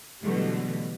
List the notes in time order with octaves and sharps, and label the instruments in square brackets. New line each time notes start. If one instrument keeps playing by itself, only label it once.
[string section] B2 D3 E3 F#3 G3 A3